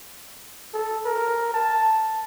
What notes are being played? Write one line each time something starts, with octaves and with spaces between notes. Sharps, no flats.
A4
A#4
A5